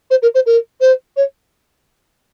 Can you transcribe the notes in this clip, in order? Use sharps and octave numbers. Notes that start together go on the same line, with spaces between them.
C5
A#4
C5
A#4
C5
C#5